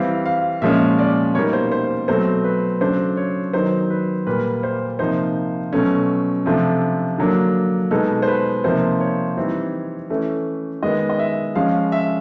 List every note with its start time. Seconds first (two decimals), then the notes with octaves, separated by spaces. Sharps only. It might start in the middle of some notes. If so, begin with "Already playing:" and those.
Already playing: E3 G3 C4 F5
0.26 F5
0.62 A#2 F3 G#3 C#4 E5
0.99 D5
1.35 B2 G3 A#3 D#4 C#5
1.53 C5
1.72 C5
2.08 B2 F#3 A3 C4 C5
2.44 B4
2.81 C#3 F#3 A3 D4 C5
3.17 C#5
3.53 D#3 F#3 B3 D#4 C5
3.90 B4
4.27 A#2 G3 A#3 B4
4.63 C5
4.99 C3 F3 A#3 D#4 C5
5.73 B2 F#3 A3 C#4
6.46 C3 F3 A3 D4
7.18 D3 F#3 A#3 D4
7.91 B2 G#3 B3 D#4 A4
8.22 C5
8.27 B4
8.64 C3 F3 A#3 D#4 C5
9.00 C#5
9.37 E3 G3 C4 D#4
10.10 E3 A3 C#4
10.83 D#3 G#3 B3 D#5
11.10 D#5
11.19 E5
11.55 F3 G#3 C#4 F5
11.92 E5